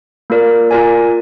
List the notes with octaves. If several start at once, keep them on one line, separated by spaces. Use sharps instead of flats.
A#3 F4 A#4 D5
F4 A#4 D5 G#5